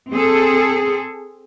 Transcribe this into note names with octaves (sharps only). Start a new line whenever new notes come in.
C4 G#4 A4